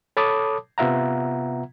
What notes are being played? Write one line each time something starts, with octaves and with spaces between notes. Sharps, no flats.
A4 C#5 A5 B5 D6 D#6
C3 B3 F4 E5 F#5 A#5